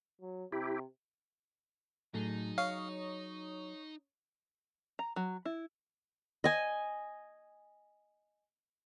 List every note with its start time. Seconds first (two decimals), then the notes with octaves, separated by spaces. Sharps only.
0.21 F#3
0.52 C3 E4 G4
2.14 A2 F#3 A3 D#4 G#4
2.58 C#5 F5 C#6 D#6
4.99 A#5
5.16 F#3
5.45 E4
6.44 D#5 G#5